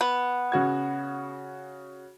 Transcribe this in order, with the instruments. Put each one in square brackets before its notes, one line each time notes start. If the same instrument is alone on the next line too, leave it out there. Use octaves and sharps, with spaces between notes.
[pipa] B3
[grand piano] C#3 F#4 G#6